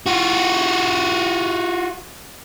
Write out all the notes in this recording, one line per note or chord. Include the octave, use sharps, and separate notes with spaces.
F4 F#4